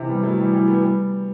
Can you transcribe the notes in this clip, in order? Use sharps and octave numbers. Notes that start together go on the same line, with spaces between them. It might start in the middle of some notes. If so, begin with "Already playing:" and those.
Already playing: C3 E3
G3 B3
F#3 A3
E3 G3
E3 G3
G3 B3
G3 B3